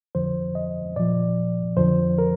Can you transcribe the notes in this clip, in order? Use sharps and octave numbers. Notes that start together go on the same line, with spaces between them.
F2 D3 F3 C5
D#5
A#2 F3 D5
F2 D3 F3 C5
A#4